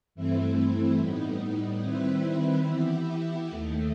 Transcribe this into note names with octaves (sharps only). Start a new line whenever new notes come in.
G2 E3 A3 C4 E4
A2 G3 B3 D#4
D#3 G3 C4 E4 B4
E3 B3 E4 G4
D#2 D#3 A3